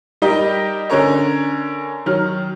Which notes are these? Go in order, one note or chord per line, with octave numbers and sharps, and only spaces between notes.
G3 D#4 G4 A#4 D#5
D3 C#4 A#4 C#5
D#3 F#3 F6